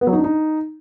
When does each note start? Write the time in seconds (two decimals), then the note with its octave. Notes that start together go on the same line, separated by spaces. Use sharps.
0.01 B3
0.07 F#3
0.13 D#4
0.18 D4
0.24 D#4